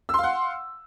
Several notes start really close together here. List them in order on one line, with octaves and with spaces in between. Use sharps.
E6 C6 F5 F#5